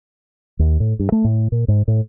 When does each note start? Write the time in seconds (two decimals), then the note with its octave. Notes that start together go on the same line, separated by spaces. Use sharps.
0.59 D#2
0.80 A2
0.99 G2
1.12 A3
1.24 A2
1.52 A#2
1.68 G#2
1.88 A2